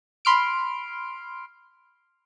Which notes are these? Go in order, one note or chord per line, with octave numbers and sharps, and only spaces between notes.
B5 C6 F6 D7